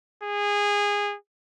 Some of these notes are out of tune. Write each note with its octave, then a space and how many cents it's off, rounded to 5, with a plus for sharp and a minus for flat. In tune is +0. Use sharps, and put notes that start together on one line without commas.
G#4 -20